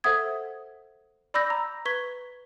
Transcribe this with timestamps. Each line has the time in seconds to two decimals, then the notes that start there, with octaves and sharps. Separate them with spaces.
0.04 A4 C5 E5 F#5 D#6 G#6
1.34 D5 B5 D6 E6 G6 A#6
1.50 A#5
1.85 B4 C#6 G#6 B6 G7